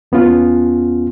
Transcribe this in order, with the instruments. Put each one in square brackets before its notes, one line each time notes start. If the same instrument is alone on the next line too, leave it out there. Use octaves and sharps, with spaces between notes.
[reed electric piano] E2 B3 C#4 F4